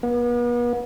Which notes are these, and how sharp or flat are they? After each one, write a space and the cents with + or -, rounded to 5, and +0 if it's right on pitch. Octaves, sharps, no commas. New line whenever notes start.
B3 -40